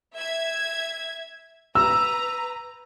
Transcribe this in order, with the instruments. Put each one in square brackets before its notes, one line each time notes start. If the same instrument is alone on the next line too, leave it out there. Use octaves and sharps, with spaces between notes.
[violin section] E5 G#6
[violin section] B4 A#5 [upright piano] E6